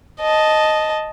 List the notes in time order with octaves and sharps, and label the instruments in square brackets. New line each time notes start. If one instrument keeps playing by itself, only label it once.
[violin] D#5 A5